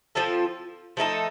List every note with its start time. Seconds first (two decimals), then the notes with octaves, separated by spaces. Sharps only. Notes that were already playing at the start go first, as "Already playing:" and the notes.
0.15 F3 C4 F4 A4
0.97 F3 A3 D#4 A4